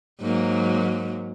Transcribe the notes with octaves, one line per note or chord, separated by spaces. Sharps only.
G#2 F#3 A#3